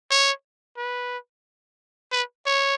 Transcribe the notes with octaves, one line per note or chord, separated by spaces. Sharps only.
C#5
B4
B4
C#5